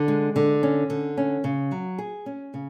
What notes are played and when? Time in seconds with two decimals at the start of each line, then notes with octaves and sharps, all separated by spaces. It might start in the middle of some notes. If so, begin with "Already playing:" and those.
Already playing: D3
0.08 G#3
0.36 D3
0.63 C#4
0.90 D3
1.17 C#4
1.44 C#3
1.71 F#3
1.99 G#4
2.26 C#4
2.54 C#3